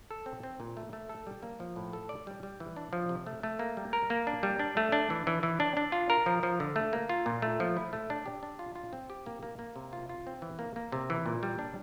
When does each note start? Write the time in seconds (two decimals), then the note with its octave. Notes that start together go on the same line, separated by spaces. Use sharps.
0.11 A4
0.26 C4
0.43 C4
0.60 A#2
0.77 A3
0.93 A3
1.09 A4
1.27 G3
1.43 A#3
1.60 F3
1.76 A2
1.93 A4
2.09 D5
2.27 G3
2.43 G3
2.60 E3
2.76 D4
2.93 F3
3.09 C3
3.26 A3
3.43 A3
3.59 A#3
3.77 G3
3.93 A#4
4.10 A#3
4.27 D4
4.43 G3
4.59 D4
4.77 A3
4.92 D4
5.10 E3
5.27 E3
5.43 E3
5.60 D4
5.77 D4
5.92 F4
6.10 A#4
6.26 F3
6.43 F3
6.60 D3
6.76 A3
6.93 A#3
7.09 F4
7.26 A#2
7.42 A3
7.60 F3
7.77 E4
7.93 A3
8.10 D4
8.26 G4
8.43 D4
8.59 F4
8.75 F4
8.93 C4
9.10 G4
9.26 A#3
9.43 A#3
9.59 A#3
9.76 C3
9.93 F4
10.09 F4
10.27 C4
10.42 E3
10.59 A#3
10.76 A#3
10.92 C3
11.10 E3
11.26 A#2
11.43 G3
11.59 D4